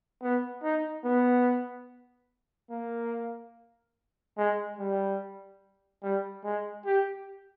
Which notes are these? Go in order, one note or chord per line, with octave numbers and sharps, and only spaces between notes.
B3
D#4
B3
A#3
G#3
G3
G3
G#3
G4